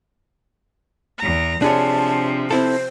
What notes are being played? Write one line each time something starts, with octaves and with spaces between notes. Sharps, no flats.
E2 A#5
C3 F3 D4 G#4 C#5 A5
C4 E4 A4 C5